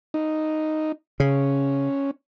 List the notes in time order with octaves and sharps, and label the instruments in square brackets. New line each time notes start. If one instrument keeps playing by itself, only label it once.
[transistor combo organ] D#4
[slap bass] C#3 [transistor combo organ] C#4